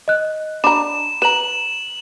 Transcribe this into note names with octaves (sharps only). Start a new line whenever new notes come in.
D#5 F#6
D4 A#5 B5 E7
B4 A#5 E7 F#7